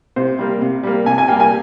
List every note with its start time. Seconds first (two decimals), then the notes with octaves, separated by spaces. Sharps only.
0.16 C3 C5
0.39 G3 A#3
0.61 C3
0.83 G3 A#3
1.06 C3 G#5
1.18 G#5
1.28 G3 A#3 G5
1.40 G#5